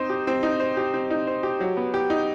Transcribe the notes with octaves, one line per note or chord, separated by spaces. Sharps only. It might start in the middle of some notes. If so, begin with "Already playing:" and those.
Already playing: C4 D#4 C5
G4
C4
D#4
C5
G4
C4
D#4
C5
G4
F#3
B3
G4
D#4